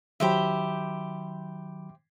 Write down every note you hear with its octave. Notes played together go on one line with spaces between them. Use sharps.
D#3 F#3 G4 C5 E5 B5